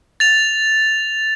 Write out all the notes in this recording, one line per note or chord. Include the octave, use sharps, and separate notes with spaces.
A6 F7